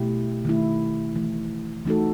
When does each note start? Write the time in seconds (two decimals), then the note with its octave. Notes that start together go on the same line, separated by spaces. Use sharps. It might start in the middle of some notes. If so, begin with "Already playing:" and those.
Already playing: B2 A3 E4 G4
0.45 D#3 A3 E4
1.15 E3 A3 E4
1.85 E3 A3 D#4 F#4 A4